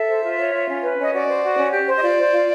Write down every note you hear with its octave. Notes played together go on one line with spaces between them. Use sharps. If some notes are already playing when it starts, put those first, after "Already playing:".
Already playing: A4 E5
C5
F4
C#5
F4
C#4
B4
C#4 D#5
F#4 D5
C5
F#4
C#4
G4
C5
D#5
F4 D5
C5
F4